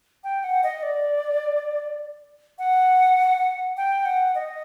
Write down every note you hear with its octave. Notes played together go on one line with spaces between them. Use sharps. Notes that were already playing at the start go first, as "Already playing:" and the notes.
G5
F#5
D#5
D5
F#5
G5
F#5
D#5